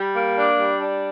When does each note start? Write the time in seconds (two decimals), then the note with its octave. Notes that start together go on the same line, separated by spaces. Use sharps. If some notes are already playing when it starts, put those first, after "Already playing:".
Already playing: G3
0.14 A#3
0.37 D4
0.59 G3
0.81 D4